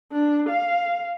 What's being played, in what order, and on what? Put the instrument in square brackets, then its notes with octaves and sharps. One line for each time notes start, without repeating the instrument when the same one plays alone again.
[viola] D4
F5